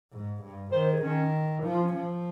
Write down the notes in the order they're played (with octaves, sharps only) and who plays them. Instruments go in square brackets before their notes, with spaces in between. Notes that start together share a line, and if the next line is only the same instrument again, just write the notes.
[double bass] G#2
G2
[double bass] D#3 [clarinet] C5
[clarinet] C5
G#4
[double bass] D#3 [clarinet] C#4
[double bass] F3 [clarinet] D#4
[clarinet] F4
C#4
[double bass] F3